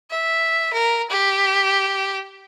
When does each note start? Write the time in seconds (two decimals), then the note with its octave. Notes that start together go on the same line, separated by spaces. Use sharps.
0.10 E5
0.73 A#4
1.10 G4